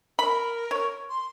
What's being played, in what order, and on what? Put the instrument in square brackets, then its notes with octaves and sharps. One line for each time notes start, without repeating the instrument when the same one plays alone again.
[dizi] A#4 [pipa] B5
[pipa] C#5
[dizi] C6